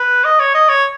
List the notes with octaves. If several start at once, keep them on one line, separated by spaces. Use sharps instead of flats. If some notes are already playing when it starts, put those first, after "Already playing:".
Already playing: B4
D#5
C#5
D#5
C#5